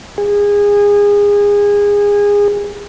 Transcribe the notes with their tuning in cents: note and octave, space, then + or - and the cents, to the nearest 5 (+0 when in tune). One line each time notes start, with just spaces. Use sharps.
G#4 -25